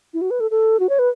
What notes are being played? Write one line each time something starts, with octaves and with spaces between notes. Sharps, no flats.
E4
F#4
B4
A4
A4
F#4
C#5
B4